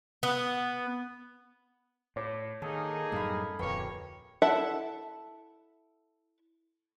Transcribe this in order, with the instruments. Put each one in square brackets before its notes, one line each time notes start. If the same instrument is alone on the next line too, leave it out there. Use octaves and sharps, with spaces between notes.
[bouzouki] B3
[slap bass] A2 [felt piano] C#5 D6
[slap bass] D#3 [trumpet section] A#3 D#4 G#4 [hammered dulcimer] A4
[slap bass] F#2 A2 G3 [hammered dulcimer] F5 B5
[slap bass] D1 F2 [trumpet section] A#3 C#5 [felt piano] B4 [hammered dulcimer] G5
[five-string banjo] E4 A4 E5 F#5 A5